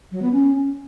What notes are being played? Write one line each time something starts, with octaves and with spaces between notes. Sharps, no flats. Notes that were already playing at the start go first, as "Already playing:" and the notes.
F#3
B3
C#4